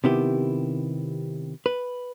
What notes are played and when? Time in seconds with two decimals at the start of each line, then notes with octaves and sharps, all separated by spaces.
0.04 C3 D#3 B3 E4 G4
1.66 B4